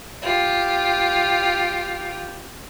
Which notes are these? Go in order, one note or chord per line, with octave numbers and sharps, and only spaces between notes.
F4 G4